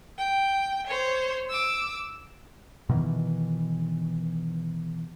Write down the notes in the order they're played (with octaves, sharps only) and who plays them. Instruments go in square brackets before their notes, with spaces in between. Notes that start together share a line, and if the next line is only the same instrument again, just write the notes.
[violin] G5
C5 C#5
D6 E6
[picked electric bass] B2 D#3 E3